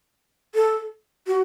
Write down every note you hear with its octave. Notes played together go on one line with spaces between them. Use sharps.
A4
F#4